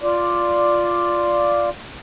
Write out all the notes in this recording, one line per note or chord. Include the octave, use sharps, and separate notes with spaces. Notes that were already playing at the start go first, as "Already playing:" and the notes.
F4 D5